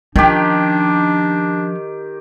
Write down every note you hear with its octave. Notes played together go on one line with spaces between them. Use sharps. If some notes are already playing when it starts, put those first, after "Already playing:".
D#3 F3 C#4 D4 G4